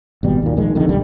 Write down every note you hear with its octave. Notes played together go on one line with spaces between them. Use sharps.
G#1 B2 G3
D#2 A#2
A#1 D#3 G#3
F2 D3 D#3
D1 B1 G3